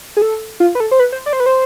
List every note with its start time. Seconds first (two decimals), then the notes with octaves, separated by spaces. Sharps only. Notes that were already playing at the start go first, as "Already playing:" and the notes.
0.17 G#4
0.22 A4
0.60 F4
0.75 B4
0.80 A4
0.91 C5
0.99 B4
1.12 C5
1.26 D5
1.33 C5
1.40 B4
1.46 C5